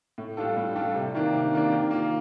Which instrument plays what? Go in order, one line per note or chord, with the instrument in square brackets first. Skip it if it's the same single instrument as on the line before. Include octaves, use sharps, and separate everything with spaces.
[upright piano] A2
G3 D4 F4 A4
A2
G3 D4 F4 A4
C3
D#3 A#3 D4
C3
D#3 A#3 D4
D#3
A#3 F4